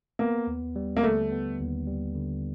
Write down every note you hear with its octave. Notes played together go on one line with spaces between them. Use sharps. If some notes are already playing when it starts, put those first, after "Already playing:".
A#3 B3
D#2
G3
A#3
D3 A3
B3
D#2
G3
D3